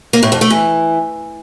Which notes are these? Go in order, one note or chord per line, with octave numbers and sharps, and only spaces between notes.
A#3
A2
F2
A3
E3